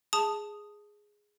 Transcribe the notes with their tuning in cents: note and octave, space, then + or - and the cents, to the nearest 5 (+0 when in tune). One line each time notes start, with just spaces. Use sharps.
G#4 +0 A5 +0 D#6 +0